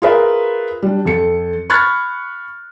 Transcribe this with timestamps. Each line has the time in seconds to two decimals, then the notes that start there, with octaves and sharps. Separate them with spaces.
0.02 F4 G#4 A#4 B4 E5
0.82 G3 D4
1.05 F2 A4 C#7
1.70 B5 C#6 F6 F#6 G#6 A6